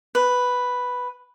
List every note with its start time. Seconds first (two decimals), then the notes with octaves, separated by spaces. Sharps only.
0.15 B4